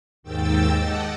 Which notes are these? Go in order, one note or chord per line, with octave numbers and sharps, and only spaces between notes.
D#2 G#2 D#3 G5 E6 A6
D#5 F#5 A5 D6